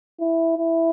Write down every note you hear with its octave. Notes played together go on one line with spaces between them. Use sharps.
E4
E4